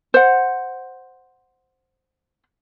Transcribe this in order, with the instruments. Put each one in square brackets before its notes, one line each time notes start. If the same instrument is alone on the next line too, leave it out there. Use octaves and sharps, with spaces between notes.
[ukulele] C5 F#5